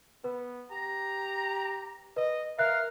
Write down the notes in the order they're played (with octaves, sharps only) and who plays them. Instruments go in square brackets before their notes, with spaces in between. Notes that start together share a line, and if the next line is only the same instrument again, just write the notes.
[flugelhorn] B3 [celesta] B4
[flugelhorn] G4 [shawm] A#5
[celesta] B4 [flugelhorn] D#5
[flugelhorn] A#4 [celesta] E5 F#6 [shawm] F5